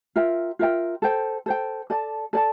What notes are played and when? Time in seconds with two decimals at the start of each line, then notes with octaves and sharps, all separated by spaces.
0.16 F4 A#4 E5 G5
0.59 F4 A#4 E5 G5
1.02 A4 C5 G5
1.46 A4 C5 G5
1.90 A4 D5 A5
2.33 A4 D5 A5